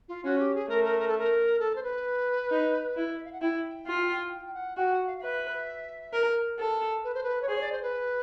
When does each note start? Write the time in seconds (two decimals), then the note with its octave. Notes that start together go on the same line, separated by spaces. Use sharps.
0.08 F4
0.24 C#4 F#4
0.39 G4
0.54 G#4
0.69 A3 A#4
0.84 A#4
0.99 A#4
1.08 A4
1.18 A#4
1.60 A4
1.76 C5
1.83 B4
2.51 D#4
2.96 E4
3.16 E5
3.25 F5
3.33 F#5
3.41 E4 G5
3.87 F4
4.32 G5
4.46 G5
4.54 F#5
4.77 F#4 G5
4.93 F#5
5.07 F5
5.18 F5
5.22 B4 E5
6.13 A#4
6.59 A4
7.04 B4
7.14 C5
7.23 B4
7.42 C#5
7.48 G#4 C5
7.56 C#5
7.61 D5
7.72 C5
7.82 B4